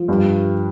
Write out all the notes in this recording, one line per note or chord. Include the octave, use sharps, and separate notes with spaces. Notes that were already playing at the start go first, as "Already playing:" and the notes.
Already playing: F3
G2